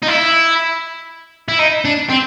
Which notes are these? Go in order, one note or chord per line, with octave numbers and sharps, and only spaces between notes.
D#4
E4
E4
D#4
D4
C4